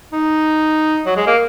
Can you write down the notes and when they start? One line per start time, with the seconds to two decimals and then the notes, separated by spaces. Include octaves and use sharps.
0.12 D#4
1.06 F#3
1.17 G#3
1.27 A#3